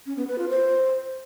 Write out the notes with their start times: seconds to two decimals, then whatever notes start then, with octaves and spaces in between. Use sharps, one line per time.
0.06 C#4
0.17 B3
0.28 B4
0.38 F4
0.49 C5